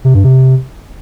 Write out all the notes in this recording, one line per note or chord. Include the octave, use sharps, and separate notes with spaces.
C3
G2
C3